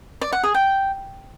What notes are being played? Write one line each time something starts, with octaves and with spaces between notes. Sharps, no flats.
D5
F#5
G#4
G5